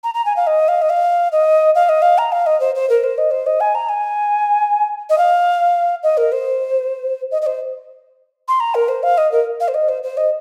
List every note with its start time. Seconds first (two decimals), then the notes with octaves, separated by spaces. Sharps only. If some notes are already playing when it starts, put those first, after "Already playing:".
0.04 A#5
0.14 A#5
0.26 G#5
0.36 F5
0.47 D#5
0.68 F5
0.82 D#5
0.90 F5
1.32 D#5
1.75 F5
1.89 D#5
2.02 F5
2.18 A#5
2.32 F5
2.46 D#5
2.60 C5
2.75 C5
2.89 A#4
3.04 C5
3.18 D#5
3.31 C5
3.46 D#5
3.60 G#5
3.75 A#5
3.89 G#5
5.10 D#5
5.18 F5
6.03 D#5
6.17 A#4
6.32 C5
7.31 D#5
7.42 D#5
7.46 C5
8.48 C6
8.60 A#5
8.75 A#4
8.88 C5
9.03 F5
9.18 D#5
9.32 A#4
9.60 F5
9.68 C5
9.74 D#5
9.89 C5
10.03 C5
10.17 D#5